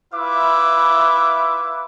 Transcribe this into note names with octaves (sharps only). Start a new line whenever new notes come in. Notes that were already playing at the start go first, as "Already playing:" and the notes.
E4 F4 B4 E5 D6